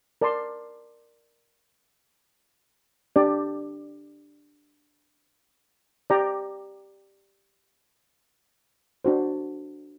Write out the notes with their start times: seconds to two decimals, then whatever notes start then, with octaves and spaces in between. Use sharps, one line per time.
0.21 A#4 D5 A5 C6
3.16 D4 G4 D5
6.10 G4 D5 G5 A#5
9.05 D4 F#4 C5